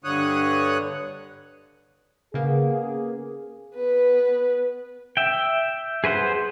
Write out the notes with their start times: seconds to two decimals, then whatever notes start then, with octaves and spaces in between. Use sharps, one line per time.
0.04 G2 D3 C#5 D#6 F#6
2.34 C#3 A#3 B3 G#4
3.75 B3 B4
5.17 E5 G5
6.04 G#4 B4 C5 F#5